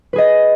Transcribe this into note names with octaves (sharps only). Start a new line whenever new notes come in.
G#4 B4 D#5